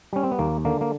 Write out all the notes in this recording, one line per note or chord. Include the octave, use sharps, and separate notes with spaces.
G3 C#4
C4
B3
D#2 A#3
D3 A#3
A#3